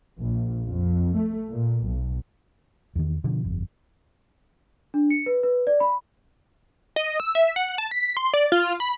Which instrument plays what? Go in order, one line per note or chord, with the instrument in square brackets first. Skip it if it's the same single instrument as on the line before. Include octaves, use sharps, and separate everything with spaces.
[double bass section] A#1
F2
A3
A#2
B1
[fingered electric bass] E2 D#3
B2 D3 F3
G1 F2
[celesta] D4
C#7
B4
B4
D5
B5
[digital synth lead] D#5
E6
E5
F#5
A5
B6
C6
D5
F4
B5